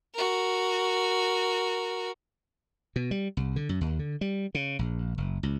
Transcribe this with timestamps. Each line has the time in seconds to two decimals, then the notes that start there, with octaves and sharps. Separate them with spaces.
0.14 F#4 A#4
2.96 B2
3.11 G3
3.37 C2
3.56 D3
3.69 F#2
3.81 D#2
3.99 D3
4.21 G3
4.55 C#3
4.79 A#1
5.18 F#1
5.43 C#2